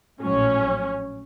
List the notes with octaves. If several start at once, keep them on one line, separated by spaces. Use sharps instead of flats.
A#1 A2 F#3 C#4